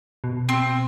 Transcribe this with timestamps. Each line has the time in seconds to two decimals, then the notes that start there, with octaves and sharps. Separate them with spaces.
0.24 B2
0.49 C4